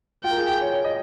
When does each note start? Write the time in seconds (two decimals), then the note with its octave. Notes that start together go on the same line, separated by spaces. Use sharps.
0.24 F4 G5
0.31 A#4
0.37 G#4
0.49 G#4
0.61 C#5
0.74 C#5
0.84 D#5